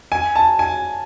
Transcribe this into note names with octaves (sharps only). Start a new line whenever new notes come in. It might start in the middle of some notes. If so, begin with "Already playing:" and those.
G#5
A5
G#5